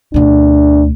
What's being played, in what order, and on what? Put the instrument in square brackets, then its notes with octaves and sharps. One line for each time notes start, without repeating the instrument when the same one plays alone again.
[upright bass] D2 B2 [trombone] D4